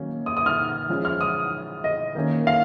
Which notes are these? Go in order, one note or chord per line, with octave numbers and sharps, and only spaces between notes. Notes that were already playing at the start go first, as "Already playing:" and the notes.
Already playing: D#3 F#3 A#3 C#4
D#6
D#6
F6
F3 G#3 C#4
F6
D#6
D#5
D#3 A#3 C#4
F5